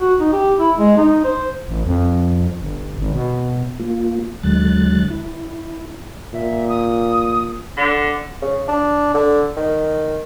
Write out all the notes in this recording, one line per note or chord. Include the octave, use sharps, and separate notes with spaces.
F#4
D#4
G4
E4
G#3
D#4
C5
A1
F2
G1
G#1
B2
A#3 F4
D#2 D3 F#3 G#3 F#6 A6
E4
A#2 E5
D#6
D3
C#3
D4
D3
D#3